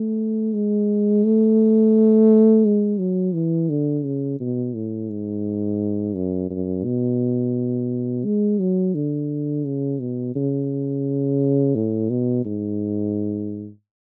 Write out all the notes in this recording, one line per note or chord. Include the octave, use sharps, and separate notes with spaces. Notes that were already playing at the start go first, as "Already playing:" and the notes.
Already playing: A3
G#3
A3
G#3
F#3
E3
D3
C#3
B2
A2
G#2
F#2
F#2
B2
G#3
F#3
D3
C#3
B2
C#3
A2
B2
G#2